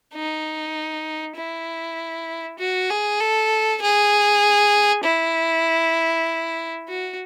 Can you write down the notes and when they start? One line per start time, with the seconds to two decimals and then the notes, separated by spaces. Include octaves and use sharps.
0.14 D#4
1.36 E4
2.59 F#4
2.90 G#4
3.20 A4
3.82 G#4
5.04 E4
6.88 F#4